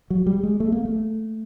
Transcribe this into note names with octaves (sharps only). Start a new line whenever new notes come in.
F#3
G3
G#3
A3
A#3
A3